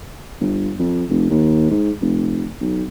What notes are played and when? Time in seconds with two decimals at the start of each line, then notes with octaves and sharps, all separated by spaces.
0.40 G1
0.79 F2
1.10 F1
1.30 D#2
1.71 G#2
2.01 F1
2.61 B1